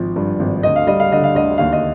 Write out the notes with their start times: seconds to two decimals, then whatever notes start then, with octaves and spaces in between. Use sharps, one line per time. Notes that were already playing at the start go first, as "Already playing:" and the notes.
Already playing: G#1 F3
0.16 G2
0.39 G#1
0.63 D2 D#5
0.76 F5
0.87 G3 D#5
1.00 F5
1.11 D3 D#5
1.24 F5
1.35 D2 D#5
1.58 D#2 F5
1.72 D#5